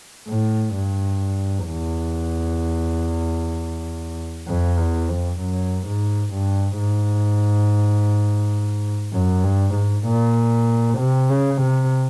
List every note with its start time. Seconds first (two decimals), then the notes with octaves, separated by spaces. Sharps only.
0.28 A2
0.74 G2
1.67 E2
4.48 F2
4.78 E2
5.09 F2
5.41 F#2
5.87 G#2
6.34 G2
6.80 G#2
9.13 F#2
9.44 G2
9.76 G#2
10.06 A#2
10.99 C3
11.30 C#3
11.62 C3